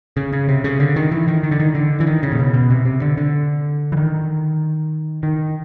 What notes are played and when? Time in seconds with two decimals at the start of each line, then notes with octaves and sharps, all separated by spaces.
0.17 C#3
0.33 C#3
0.48 C3
0.64 C#3
0.80 D3
0.96 D#3
1.11 E3
1.28 D#3
1.43 D#3
1.51 D3
1.60 D#3
1.75 D3
2.00 E3
2.07 D#3
2.23 C#3
2.32 A#2
2.39 B2
2.54 B2
2.70 C3
2.85 C3
3.02 D3
3.18 D3
3.92 E3
3.97 D#3
5.23 D#3